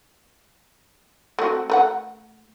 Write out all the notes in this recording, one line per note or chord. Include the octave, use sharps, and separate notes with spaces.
A3 C4 F#4
A3 A#4 F#5